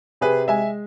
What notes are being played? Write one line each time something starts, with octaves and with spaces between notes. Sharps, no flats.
C3 G#4 B4
G#3 E5 G#5